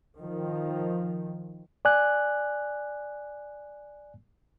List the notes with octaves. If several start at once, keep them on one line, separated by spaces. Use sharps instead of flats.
D#3 F3
D5 G#5 F#6